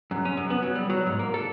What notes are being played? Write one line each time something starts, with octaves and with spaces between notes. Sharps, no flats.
F#2
C#4
F#2
B3
F#3
G3
F#3
G#2
A#3
A4